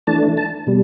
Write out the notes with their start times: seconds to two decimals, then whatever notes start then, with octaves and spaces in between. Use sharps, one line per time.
0.07 E3 A3 D4 A5
0.37 A5
0.67 B2 G3